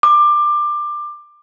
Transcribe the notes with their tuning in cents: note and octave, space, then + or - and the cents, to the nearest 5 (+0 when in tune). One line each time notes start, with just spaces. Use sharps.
D6 +20